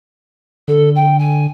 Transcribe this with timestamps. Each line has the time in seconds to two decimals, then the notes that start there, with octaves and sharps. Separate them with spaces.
0.68 D3 A4
0.95 G5
1.19 G#5